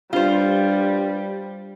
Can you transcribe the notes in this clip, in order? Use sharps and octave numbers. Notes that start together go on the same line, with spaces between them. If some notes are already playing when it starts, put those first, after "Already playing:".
G2 G3 F4 C5